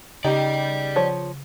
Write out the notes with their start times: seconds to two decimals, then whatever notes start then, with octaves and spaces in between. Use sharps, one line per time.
0.25 C#3 D#4 G4 D5 G5
0.96 F3 C#5